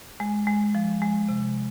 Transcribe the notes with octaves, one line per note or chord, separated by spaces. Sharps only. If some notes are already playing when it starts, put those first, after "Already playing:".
G#3
G#3
F3
G#3
C3